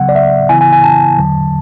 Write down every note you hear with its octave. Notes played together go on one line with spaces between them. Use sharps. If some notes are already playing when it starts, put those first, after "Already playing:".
Already playing: C#3 F#3 B3 F#5
D5
E5
C#3 E3 B3 E4 G#5
G#5
G#5
A5
E2 D3 F#3